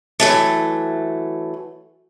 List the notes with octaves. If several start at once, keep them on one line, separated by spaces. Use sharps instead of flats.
E3 F#3 A3